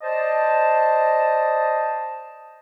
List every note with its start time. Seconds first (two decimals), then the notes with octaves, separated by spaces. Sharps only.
0.02 C5 D5 D#5 A5